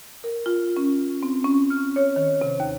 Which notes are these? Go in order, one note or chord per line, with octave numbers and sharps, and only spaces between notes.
A#4
F4
C#4
C4
C#4
F6
C#5
D#3
C3
D#2